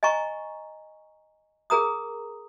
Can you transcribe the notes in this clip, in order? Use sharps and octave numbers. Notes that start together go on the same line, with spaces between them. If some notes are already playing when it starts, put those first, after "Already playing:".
D#5 G#5 A#5 C#6
G#4 A#4 A#5 D#6